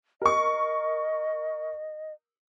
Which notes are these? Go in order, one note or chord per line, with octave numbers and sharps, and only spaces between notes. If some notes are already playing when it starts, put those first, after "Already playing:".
A#4 D#5 C#6